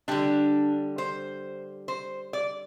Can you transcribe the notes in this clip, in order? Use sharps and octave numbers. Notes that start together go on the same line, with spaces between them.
D3 G3 D4
C5
C5
D5